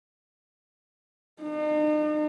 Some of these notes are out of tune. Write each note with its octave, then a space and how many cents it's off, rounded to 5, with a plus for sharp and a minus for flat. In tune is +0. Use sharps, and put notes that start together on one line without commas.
D#4 -45